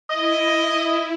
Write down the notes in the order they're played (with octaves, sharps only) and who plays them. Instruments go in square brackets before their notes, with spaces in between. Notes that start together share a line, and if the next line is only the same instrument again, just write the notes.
[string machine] E4 [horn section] D#5